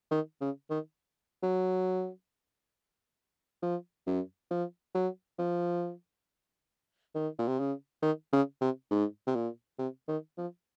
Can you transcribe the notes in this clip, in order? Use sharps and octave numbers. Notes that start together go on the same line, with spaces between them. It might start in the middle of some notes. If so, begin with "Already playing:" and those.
D#3
C#3
D#3
F#3
F3
F#2
F3
F#3
F3
D#3
A#2
C3
C#3
D#3
C#3
C3
G#2
C3
A#2
C3
D#3
F3